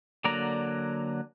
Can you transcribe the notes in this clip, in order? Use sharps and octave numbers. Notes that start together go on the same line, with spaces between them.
D3 F#3 A#3 D5 A#5